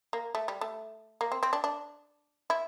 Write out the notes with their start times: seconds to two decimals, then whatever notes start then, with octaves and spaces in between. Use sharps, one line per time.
0.13 A#3
0.35 A3
0.48 G3
0.61 A3
1.21 A#3
1.32 C4
1.43 C4
1.53 D4
1.64 D4
2.50 E4